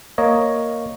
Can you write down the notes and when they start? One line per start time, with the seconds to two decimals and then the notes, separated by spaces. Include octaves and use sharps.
0.18 A#3 C#5 D#5